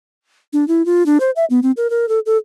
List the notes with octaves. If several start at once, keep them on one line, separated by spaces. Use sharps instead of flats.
D4
E4
F4
D4
C5
E5
B3
C4
A#4
A#4
A4
A4